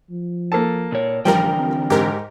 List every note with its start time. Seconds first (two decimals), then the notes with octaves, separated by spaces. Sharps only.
0.11 F3
0.52 A#3 A4 A5
0.92 A#2 C#5
1.25 A1 D3 E3 F3 G3 A#4 G5
1.59 C4
1.90 G#2 G4 A#4